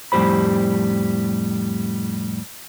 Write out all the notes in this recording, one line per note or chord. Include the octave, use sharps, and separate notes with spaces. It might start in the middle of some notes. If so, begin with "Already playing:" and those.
F2 A2 G3 G4 C5 B5